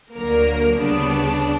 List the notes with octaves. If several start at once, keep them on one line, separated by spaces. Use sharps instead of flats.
D2 D3 F#3 A#3 A#4
D2 C#3 G3 B3 D4